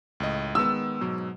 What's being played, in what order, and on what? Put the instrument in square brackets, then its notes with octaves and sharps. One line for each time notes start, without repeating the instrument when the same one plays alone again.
[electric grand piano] C#2 A2 D#5
[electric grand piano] D#3 G#3 B3 [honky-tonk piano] E6
[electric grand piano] G#2 B2 F#3